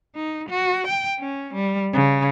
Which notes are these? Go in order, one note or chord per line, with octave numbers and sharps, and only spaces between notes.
D#4
F#4
G5
C#4
G3
C#3